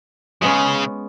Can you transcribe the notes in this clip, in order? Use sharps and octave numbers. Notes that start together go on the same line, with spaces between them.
C#3 G#3 B3 C#4